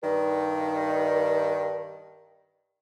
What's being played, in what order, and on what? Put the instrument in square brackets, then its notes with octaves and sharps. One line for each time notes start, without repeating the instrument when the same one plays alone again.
[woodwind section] G2 D#3